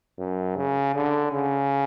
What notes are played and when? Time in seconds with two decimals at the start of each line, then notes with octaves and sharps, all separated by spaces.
0.19 F#2
0.57 C#3
0.95 D3
1.33 C#3